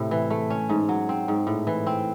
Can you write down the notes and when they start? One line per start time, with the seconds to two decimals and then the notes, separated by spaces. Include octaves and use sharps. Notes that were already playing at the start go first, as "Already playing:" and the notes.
Already playing: A2 C3
0.11 E3
0.30 A3
0.50 C#4
0.69 G#2
0.89 F#3
1.09 C4
1.28 G#2
1.47 A2
1.67 E3
1.87 C4